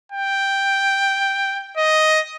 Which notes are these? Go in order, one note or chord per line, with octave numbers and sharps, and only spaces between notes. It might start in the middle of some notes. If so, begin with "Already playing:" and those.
G5
D#5